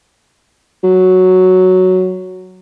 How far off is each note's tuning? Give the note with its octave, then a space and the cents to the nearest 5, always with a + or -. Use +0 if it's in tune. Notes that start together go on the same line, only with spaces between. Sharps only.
F#3 +0